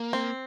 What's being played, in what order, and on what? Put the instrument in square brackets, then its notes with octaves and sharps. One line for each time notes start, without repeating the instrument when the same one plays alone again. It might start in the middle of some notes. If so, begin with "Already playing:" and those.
Already playing: [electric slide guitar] A#3
[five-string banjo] C4